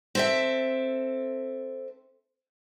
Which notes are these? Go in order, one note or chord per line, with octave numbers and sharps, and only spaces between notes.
C4 A4 E5